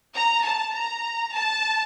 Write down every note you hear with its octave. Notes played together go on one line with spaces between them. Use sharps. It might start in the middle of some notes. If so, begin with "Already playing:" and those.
A#5
A5
A#5
A5